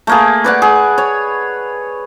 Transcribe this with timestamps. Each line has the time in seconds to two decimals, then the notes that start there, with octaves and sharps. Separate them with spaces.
0.07 A3 A#3 G#4
0.44 B4 D5 F#5
0.62 G#4
0.98 C#5